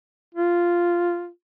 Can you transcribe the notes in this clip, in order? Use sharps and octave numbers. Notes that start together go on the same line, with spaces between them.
F4